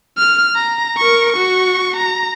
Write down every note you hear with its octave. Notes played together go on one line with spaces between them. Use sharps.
F6
A#5
A#4 C#6
F#4 C#6
A#5